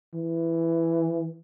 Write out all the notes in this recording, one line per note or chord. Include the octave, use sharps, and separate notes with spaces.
E3